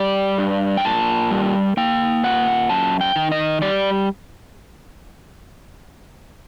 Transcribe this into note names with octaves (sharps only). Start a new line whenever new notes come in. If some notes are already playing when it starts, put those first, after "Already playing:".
Already playing: G3 D5
G2
G5
A#2 A5
G3
A#3 G5
A#2 F#5
F#2 A5
G5
D#3
D#5
G3 D5